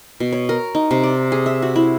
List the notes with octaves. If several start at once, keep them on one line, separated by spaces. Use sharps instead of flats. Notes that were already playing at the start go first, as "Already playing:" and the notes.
B2
C#5
A#4
D#4
C3
D5
G#4
E5
F#4
E4